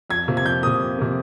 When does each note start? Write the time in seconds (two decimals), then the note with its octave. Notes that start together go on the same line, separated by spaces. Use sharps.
0.10 F2 G#6
0.27 C3 F3 A#3
0.37 G#6
0.46 F2 G6
0.63 C3 F3 A#3 D#6
0.81 F2
0.98 C3 F3 A#3